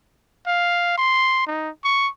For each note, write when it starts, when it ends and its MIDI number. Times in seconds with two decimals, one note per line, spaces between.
0.47 0.95 77
0.98 1.46 84
1.47 1.69 63
1.84 2.09 85